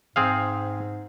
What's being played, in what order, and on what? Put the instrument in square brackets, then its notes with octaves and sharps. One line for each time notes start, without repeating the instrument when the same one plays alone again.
[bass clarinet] G#2 [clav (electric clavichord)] C4 G#4 F5